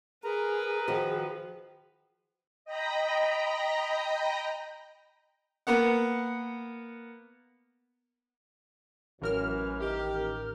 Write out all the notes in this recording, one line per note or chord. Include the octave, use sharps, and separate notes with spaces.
G#4 A#4 B4 A#5
D#3 F3 F#4
D#5 G5 A#5 B5 A#6
A#3 B3 F#5
A1 F#2 E3 A#4 F6
D#3 G4